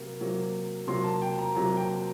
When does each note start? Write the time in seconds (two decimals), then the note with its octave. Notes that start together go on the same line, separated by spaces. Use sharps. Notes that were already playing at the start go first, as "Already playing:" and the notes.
Already playing: C3 F#3 A#3
0.20 C3 F#3 A#3
0.87 C3 F#3 A#3 C6
1.04 A5
1.22 G5
1.39 A#5
1.54 C3 F#3 A#3 A#5
1.77 G5